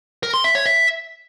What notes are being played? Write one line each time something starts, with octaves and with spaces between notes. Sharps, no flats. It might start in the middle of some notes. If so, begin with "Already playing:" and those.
A#4
C6
E5
C#5
E5